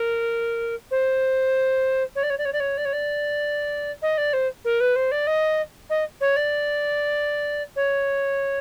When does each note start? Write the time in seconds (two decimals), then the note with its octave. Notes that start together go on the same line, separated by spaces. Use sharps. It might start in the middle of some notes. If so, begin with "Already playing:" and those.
Already playing: A#4
0.91 C5
2.15 C#5
2.23 D5
2.30 C#5
2.38 D5
2.45 C#5
2.52 D5
2.60 C#5
2.77 D5
2.85 C#5
2.92 D5
4.02 D#5
4.17 D5
4.33 C5
4.64 A#4
4.80 B4
4.95 C5
5.11 D5
5.27 D#5
5.89 D#5
6.20 C#5
6.36 D5
7.76 C#5